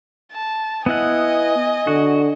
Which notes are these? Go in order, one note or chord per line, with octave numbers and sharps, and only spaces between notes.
A5
B3 E4 D#5 F#5 G#5
D3 F#4